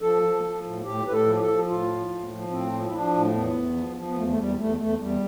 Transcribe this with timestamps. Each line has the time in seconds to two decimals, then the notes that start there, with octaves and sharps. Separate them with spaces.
0.02 F3 A4
0.23 F3
0.43 F3
0.64 A2
0.84 A2 G4
1.05 A2 B4
1.12 A4
1.26 F3
1.36 G4
1.40 A4
1.48 F3
1.68 A2 F4
1.88 F3
2.09 A2
2.29 F3
2.51 A2 C4
2.72 F3
2.88 E4
2.92 F3 D4
3.14 A2
3.34 E2 B3
3.55 E2
3.76 F3
3.96 F3
4.07 B3
4.16 E2 A3
4.28 A3
4.37 E2 G3
4.58 E2 A3
4.80 E2 A3
5.00 E2 G3